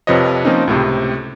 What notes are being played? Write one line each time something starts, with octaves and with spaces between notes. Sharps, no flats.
F2 C3 F3 B4 C#5 D#5
F3 A#3 C4 C#4 D#4
C#2 A2 C3